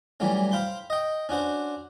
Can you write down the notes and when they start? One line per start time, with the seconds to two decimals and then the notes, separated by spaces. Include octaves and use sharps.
0.20 E3 F#3 G3 A3 C#4
0.51 C5 F5 G5 B5 C6
0.90 D#5 G5
1.29 C#4 D4 F#4 C5